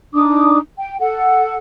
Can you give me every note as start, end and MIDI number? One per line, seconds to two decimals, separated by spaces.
0.13 0.58 62
0.13 0.58 63
0.13 0.58 86
0.13 0.58 87
0.78 0.98 79
1.00 1.57 69
1.00 1.57 78